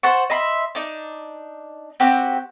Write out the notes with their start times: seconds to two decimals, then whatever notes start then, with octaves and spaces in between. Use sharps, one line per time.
0.03 C5 F#5 A5 C#6
0.30 D#5 E5 B5 C6
0.75 D4 D#4
2.00 C4 F#4 G4 F#6